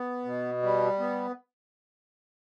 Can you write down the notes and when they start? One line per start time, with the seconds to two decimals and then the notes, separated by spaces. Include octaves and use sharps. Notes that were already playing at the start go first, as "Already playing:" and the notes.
Already playing: B3
0.25 B2
0.63 G3
0.99 B3